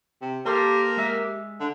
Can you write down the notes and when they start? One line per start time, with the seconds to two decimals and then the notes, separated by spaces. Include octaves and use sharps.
0.21 C3
0.45 A#3 G4 A4 C5
0.97 G#3 E5
1.60 D3